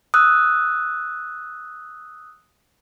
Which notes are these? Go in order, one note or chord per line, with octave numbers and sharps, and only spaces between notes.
D#6 E6 F#6